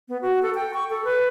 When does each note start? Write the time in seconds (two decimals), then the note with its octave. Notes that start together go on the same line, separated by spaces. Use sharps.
0.09 B3
0.21 F#4
0.42 A4
0.55 G5
0.74 C#6
0.90 A4
1.04 B4